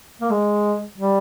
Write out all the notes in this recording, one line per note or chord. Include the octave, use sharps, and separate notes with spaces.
A#3
G#3
G3